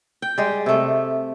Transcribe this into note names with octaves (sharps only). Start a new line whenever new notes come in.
G5
G3 G#3
C3 A3